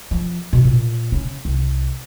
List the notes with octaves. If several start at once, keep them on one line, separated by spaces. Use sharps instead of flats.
F3
B2
A#2
C#3
C2